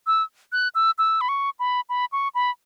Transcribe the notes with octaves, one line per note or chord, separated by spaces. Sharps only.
E6
F#6
E6
E6
B5
C#6
B5
B5
C#6
B5